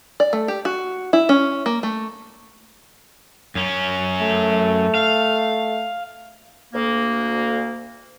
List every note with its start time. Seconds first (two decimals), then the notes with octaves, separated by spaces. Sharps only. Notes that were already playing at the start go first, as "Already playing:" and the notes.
0.20 D5
0.33 A3
0.48 G4
0.65 F#4
1.13 E4
1.29 C#4
1.66 A#3
1.83 A3
3.55 F#2 C#4
4.21 A3
4.95 F5
6.74 D2 A#3